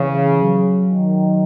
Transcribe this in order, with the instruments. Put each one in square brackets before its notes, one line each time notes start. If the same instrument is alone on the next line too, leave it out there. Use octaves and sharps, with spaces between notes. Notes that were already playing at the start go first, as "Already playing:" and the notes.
Already playing: [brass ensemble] C#3 [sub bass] E3
[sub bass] F#3
[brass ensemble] D#3